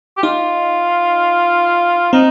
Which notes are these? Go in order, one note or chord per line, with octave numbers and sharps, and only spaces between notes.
G4
D#4 F4
C4 D#4